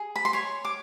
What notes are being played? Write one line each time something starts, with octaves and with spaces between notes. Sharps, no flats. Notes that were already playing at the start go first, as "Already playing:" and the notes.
Already playing: G#4
B5
C6
C#5 C#6
D6